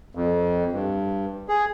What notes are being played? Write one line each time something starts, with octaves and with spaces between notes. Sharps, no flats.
F2
G2
G#4